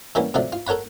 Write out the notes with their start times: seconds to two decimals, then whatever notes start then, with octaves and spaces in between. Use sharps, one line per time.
0.15 E3 G3 A#3 B3 C#4
0.34 C3 F3 F#3 A3 D4
0.52 F4
0.67 A4 A#4 C#5 F#5 B5